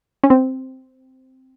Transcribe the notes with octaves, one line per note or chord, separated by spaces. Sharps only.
C#4
C4